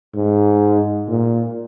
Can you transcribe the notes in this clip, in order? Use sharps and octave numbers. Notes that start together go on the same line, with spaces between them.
G#2
A#2